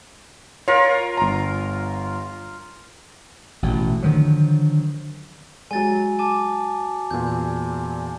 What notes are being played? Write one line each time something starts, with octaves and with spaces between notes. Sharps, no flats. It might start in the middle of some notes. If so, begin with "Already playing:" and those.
F4 A#4 C#5
G1 A#5
A1 B2 A3
D3 D#3 F3 F#3
F#3 G#3 G#5 A6
G#5 A5 D6
E2 A#2 G6